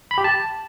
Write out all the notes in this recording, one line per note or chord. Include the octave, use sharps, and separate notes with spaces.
B5
G4
A5